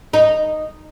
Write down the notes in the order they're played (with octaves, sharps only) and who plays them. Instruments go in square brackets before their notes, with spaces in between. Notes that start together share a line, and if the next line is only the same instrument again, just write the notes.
[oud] D#4